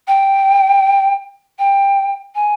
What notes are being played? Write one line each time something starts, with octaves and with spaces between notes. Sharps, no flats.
G5
G5
G#5